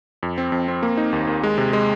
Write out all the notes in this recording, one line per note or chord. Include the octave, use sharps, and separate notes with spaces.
F2
C4
F2
C4
A#3
D#4
D#2
D#2
G#3
C3
G#3